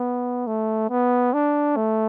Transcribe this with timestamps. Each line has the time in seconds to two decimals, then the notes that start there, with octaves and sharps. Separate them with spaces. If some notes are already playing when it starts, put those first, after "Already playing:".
Already playing: B3
0.47 A3
0.90 B3
1.34 D4
1.77 A3